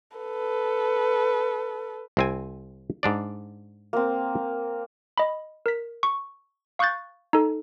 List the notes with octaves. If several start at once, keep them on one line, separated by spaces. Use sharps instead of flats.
A4 B4
C2 C4 G#5
G#2 D4 D5
A#3 C4
D#5 B5
A#4 B6
C#6
F5 C#6 D#6 F#6 G6 A6
D#4 A4